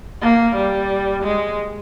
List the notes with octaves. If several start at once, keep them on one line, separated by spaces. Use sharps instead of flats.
A#3
G3
G#3